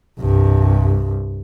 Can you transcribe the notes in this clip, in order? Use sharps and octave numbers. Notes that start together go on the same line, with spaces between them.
C2 G2